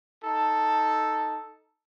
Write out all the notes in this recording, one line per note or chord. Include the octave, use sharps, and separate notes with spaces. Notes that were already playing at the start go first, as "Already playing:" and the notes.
D#4 A4